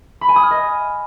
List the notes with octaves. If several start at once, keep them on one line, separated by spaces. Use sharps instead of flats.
B5
G#5
D#6
F6
D#5